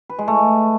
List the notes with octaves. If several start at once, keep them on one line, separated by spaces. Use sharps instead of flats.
B4
G#3
A3